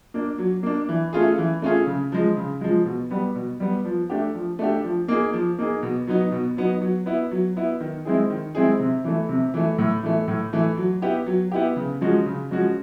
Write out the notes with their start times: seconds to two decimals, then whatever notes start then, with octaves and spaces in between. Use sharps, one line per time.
0.14 A#3 D4
0.38 F#3
0.63 A#3 D4
0.89 E3
1.13 A3 C#4 F4 G#4
1.38 E3
1.62 A3 C#4 F4 G#4
1.87 C#3
2.12 F3 G#3
2.36 C#3
2.61 F3 G#3
2.86 B2
3.11 G3 B3
3.35 B2
3.60 G3 B3
3.85 F3
4.10 A3 D4 G4
4.34 F3
4.59 A3 D4 G4
4.84 F3
5.08 A#3 D#4 G#4
5.33 F3
5.58 A#3 D#4 G#4
5.83 B2
6.07 F#3 B3 D#4
6.32 B2
6.57 F#3 B3 D#4
6.82 F#3
7.06 B3 E4
7.31 F#3
7.56 B3 E4
7.80 D#3
8.05 G#3 C4 E4 G#4
8.30 D#3
8.55 G#3 C4 E4 G#4
8.80 C3
9.04 E3 A3
9.29 C3
9.54 E3 A3
9.78 A2
10.03 E3 A3
10.28 A2
10.53 E3 A3
10.77 F#3
11.02 B3 E4 G4
11.26 F#3
11.52 B3 E4 G4
11.76 C#3
12.01 F3 G#3 C#4 F#4
12.26 C#3
12.51 F3 G#3 C#4 F#4